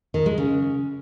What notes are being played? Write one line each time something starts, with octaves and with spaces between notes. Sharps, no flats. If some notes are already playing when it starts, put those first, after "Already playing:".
D#3
G#3
C#3